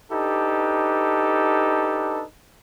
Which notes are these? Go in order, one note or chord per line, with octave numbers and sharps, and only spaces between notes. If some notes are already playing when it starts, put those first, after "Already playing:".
D4 D#4 G4 A4 B4